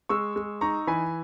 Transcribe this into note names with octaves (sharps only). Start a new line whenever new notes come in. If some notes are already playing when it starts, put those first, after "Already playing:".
G#3 C#6 E6
G#3
D#4 A#5 C#6
E3 G#5 B5